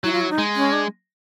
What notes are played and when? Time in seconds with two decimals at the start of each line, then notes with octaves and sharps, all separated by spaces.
0.04 F#3 E4
0.12 F4
0.21 E4
0.30 D#4
0.38 G#3
0.56 C#4
0.73 D4